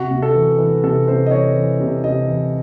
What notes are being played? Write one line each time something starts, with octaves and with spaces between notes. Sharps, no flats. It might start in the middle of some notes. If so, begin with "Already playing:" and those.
Already playing: C3 F#4
C3
A4
E3
E3
C3 A4
C3 C5
D#5
E3 C#5
E3
C3
C3 D#5
E3